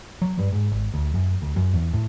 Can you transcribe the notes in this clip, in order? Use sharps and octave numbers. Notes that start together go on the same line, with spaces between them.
F#3
G2
G#2
G#1
D2
F#2
D2
F#2
E2
A2